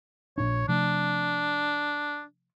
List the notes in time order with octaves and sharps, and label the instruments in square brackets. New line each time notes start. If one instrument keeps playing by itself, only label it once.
[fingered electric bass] A#1 A#2 D4 [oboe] C#5
[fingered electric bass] C3 F3 A3 [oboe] D4